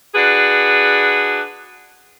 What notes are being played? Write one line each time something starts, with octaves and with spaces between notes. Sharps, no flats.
D4 F#4 G#4 B4